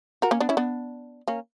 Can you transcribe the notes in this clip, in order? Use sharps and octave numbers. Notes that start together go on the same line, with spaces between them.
F#4 A#4
A#3 C#4
B3 D4
C#4 E4
B3 D4
A#3 C#4